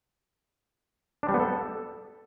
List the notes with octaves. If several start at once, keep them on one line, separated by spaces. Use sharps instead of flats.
D4
G3
B3
A4